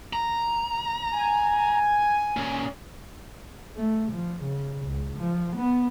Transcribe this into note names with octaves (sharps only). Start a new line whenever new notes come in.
A#5
G#5
A#2 C#4
A3
F3
C#3
C#2
F3
B3